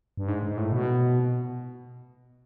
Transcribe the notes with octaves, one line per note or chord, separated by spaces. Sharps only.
G2
G#2
G#2
A2
B2